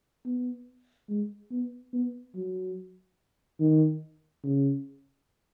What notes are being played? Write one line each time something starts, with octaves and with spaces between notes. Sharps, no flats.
B3
G#3
B3
B3
F#3
D#3
C#3